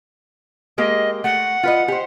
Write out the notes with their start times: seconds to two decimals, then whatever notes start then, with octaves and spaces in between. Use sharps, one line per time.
0.78 G#3 A#3 G4 D#5
1.24 A3 F#5
1.63 F4 B4 D#5
1.88 G4 C5